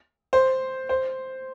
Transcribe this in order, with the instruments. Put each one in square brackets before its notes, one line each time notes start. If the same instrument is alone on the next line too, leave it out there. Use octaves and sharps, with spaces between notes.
[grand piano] C5
C5